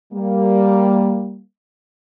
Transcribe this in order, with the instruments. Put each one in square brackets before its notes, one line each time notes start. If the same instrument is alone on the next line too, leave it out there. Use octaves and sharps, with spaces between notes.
[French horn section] G3 A#3